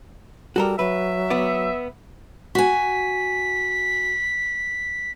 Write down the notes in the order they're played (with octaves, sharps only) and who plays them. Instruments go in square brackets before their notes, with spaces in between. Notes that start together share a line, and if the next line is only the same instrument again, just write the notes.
[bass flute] G3 [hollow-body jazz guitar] F#4 A4 A#4
[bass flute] F#3 [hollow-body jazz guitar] B4 [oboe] E5
[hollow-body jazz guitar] B3 D5
[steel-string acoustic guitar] F#4 G#5 [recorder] B6